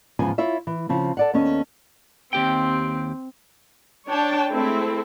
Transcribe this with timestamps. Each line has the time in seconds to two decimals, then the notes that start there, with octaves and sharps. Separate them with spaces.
0.19 E2 G#2 C#3 F3 G#5
0.38 E4 F4 C#5 E5
0.67 E3
0.89 C#3 F3 C4
1.17 A4 D5 F#5
1.34 D#2 B3 C#4 A4 D#5
2.33 D#2 C4 G4 G5
4.09 D4 C#5 G5 A5
4.50 G#3 A3 C4 E4 A4